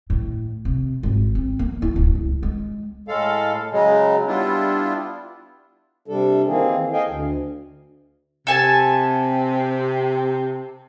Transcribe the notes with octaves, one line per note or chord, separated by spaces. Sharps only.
A2
C3
G#1
C4
A#3
E4
D1
C#2
G#3
A2 G#3 A4 F5
C#3 F#3 G#3
G3 B3 D4 E4 F4
C3 G3 D4 A4
D#3 E3 A#3 C4 G#4
A4 D#5 F5 G5 G#5
D2
C3 A4 G#5 A5